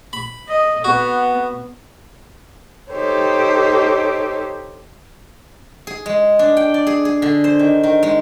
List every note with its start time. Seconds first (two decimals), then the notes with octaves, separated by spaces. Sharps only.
0.13 B5
0.48 D#5
0.84 B3 F#4
2.91 D#4 G4 A4 C5 C#5
5.87 G#4
6.06 G#3
6.39 D4
6.57 G5
6.74 D5
6.87 G#4
7.05 G#4
7.22 D3
7.44 C5
7.59 D#3
7.83 D#3
8.03 G#3